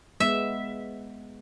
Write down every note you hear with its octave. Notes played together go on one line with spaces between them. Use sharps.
G#3 B3 E5